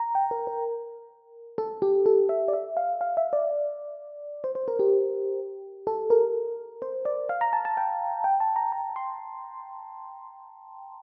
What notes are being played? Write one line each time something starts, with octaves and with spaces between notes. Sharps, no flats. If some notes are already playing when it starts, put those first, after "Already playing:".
Already playing: A#5
G5
A#4
A#4
A4
G4
A4
E5
D5
E5
F5
F5
E5
D5
C5
C5
A#4
G4
A4
A#4
C5
D5
F5
A#5
A5
A5
G5
G5
A5
A#5
A#5
C6